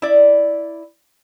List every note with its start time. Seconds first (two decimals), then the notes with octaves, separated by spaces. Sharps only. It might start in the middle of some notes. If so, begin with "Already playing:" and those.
0.02 E4 D5